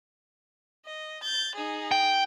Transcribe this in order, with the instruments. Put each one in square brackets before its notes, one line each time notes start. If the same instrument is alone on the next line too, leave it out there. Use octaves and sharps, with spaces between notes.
[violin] D#5
G6 A6
D#4 G#4
[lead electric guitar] G5